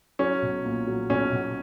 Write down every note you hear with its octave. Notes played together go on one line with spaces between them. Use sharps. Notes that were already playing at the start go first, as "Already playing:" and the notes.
F#3 C#4
B1
A#2
F#3
B1 C#4
B1